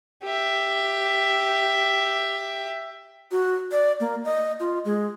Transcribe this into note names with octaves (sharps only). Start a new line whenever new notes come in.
G4 E5
F#4
D5
A#3
D#5
F4
G#3